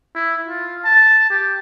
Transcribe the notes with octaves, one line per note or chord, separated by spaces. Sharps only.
E4
F4
A5
G4